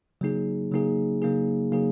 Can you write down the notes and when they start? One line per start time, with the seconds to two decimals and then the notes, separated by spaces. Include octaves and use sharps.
0.21 C#3 F#3 A#3 D#4 G#4
0.71 C#3 F#3 A#3 D#4 G#4
1.22 C#3 F#3 A#3 D#4 G#4
1.72 C#3 F#3 A#3 D#4 G#4